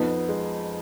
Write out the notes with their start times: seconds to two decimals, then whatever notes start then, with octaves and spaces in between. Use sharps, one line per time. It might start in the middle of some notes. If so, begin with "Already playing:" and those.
Already playing: F2 B3 D#4
0.29 G#3